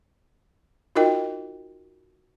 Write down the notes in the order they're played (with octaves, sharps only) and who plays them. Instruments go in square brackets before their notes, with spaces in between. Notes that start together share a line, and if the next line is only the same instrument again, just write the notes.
[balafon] D#4 F4 F#4 A#4 D#5 G5